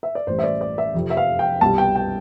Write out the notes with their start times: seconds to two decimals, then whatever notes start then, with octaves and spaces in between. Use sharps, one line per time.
0.03 E5
0.15 D5
0.27 A1 A2 G3 C5
0.39 E5
0.44 D5
0.61 D5
0.78 E5
0.94 F1 F2 C3
1.10 E5
1.17 F5
1.39 G5
1.61 C2 B2 G3 A5
1.78 G5
1.95 G5